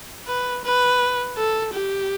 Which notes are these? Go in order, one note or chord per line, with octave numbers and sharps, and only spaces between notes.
B4
B4
A4
G4